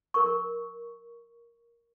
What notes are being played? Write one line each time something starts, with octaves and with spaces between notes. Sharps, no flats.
A#4 C#6